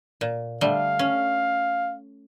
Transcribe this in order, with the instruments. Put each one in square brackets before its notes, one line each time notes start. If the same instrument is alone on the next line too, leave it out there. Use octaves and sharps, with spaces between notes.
[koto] A#2
[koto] D3 G3 A3 [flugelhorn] F5
[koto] C#4